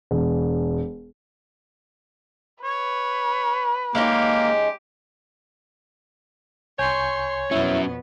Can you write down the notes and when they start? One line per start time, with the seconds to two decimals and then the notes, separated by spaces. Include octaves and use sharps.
0.11 E1
2.64 B4 C#5
3.95 G#3 A#3 C#4 D#4 G4
6.79 C2 C#5 G#5 C6 C#6 G6
7.51 F2 B2 F#3 B3 C#4 E4 E5